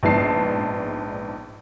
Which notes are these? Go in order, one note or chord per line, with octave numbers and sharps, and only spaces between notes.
A#1 G#2 B3 D4 A5 C7